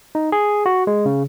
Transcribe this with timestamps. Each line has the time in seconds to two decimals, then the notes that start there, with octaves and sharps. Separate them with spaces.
0.15 D#4
0.32 G#4
0.66 F#4
0.87 G#3
1.05 C#3